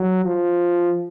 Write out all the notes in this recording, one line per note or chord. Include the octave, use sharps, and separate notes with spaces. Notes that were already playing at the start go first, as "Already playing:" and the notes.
Already playing: F#3
F3